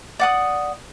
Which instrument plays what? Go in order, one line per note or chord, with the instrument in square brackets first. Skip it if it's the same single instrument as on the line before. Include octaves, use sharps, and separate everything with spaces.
[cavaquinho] D5 F#5 D#6